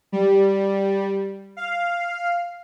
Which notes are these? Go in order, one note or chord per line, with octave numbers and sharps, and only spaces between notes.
G3
F5